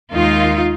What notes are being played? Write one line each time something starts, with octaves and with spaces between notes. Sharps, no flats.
D#2 D#3 G#3 D#4 F4